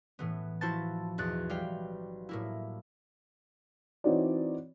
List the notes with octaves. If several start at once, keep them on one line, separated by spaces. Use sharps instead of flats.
A2 E3 B3
F3 E4 F#4 C5 A5 A6
B1 E2 F#6 A6
G3 F5 G5
A2 A#3 E4
E3 C4 D#4 F#4 C#5 D5